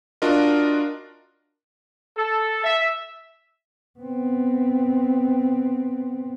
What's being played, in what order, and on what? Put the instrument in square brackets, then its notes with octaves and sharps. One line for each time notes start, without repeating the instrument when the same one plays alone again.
[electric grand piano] D4 F4 F#4 A#4 D#5
[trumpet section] A4
E5
[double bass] B3 C4